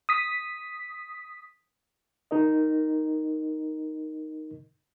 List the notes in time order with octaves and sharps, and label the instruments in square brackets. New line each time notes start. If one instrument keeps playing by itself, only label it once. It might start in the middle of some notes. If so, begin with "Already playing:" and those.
[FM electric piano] D#6 B6
[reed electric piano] D#4 A#4 D#5